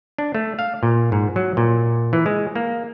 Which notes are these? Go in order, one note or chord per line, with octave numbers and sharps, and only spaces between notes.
D4
A3
F5
A#2
G#2
F#3
A#2
E3
G#3
A#3